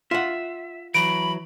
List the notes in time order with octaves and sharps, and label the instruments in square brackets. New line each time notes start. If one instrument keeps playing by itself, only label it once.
[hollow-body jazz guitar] F4 F#5 [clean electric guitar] E5
[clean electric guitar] E3 F#3 [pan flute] B5 [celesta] D7